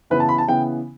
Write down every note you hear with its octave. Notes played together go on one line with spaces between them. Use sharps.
C#3 E3 B3 B4
A5
B5
A5
C#3 E3 B3 G5